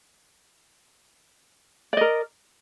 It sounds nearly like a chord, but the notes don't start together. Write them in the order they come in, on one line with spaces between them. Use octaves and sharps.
D5 D#5 A#4